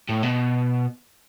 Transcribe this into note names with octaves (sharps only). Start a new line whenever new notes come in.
A2
B2